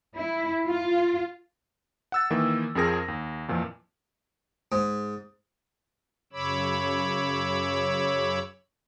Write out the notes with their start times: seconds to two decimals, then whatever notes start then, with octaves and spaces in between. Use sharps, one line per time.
0.17 E4
0.67 F4
2.12 F#5 E6 A6
2.30 D#3 E3 A#3
2.75 F2 F3 C4 G#4 A#4 A#6
3.08 D#2
3.48 F2 A#2 E3 F3
4.72 G#2
6.33 F#2 C#3 C#5 B5 D6 E6